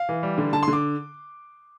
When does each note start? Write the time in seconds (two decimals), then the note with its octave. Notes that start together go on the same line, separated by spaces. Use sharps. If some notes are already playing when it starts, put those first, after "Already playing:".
Already playing: F5
0.09 E3
0.23 G3
0.38 D3
0.53 D3 A5
0.63 C6
0.68 D3
0.73 D6